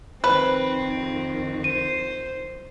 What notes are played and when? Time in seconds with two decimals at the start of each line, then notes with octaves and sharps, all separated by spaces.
0.24 F2 D#3 C4 B4 C5 B5
1.64 C5 D#7